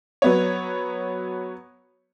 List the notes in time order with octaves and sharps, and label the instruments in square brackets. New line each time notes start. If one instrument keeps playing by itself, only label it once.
[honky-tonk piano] F#3 B3 C#5